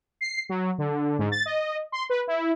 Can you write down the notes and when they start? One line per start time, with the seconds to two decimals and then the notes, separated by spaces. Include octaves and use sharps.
0.21 C7
0.49 F#3
0.78 D3
1.19 G#2
1.32 A6
1.46 D#5
1.92 C6
2.10 B4
2.27 E4